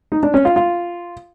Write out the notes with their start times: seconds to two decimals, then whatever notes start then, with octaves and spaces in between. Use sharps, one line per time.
0.12 D#4
0.23 D4
0.34 C#4
0.45 F4
0.56 F4